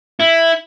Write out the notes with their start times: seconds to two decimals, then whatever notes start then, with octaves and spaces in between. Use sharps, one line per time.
0.20 E4